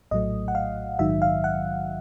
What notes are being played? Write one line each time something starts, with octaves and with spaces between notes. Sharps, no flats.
A#1 A2 F#3 A3 D#5
F#5
F5
A#1 G#2 D#3 F#3 E5
F5
F#5